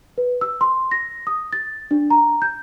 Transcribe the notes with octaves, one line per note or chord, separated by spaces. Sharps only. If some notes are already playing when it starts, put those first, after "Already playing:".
B4
E6
C6
A#6
D#6
A6
D4
A#5
G6